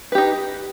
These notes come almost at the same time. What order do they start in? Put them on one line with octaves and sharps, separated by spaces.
B4 G4 D#4